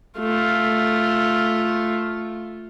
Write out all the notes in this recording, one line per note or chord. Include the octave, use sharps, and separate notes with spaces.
A3 F4